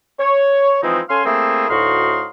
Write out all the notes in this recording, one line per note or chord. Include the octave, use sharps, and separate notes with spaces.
C#5
E3 F3 G#3 C4 D#4 E4
C#4 A4 F5 G#5 C6
A3 A#3 C4 E4 G#4
D2 A2 D#4 F#4 F5 C6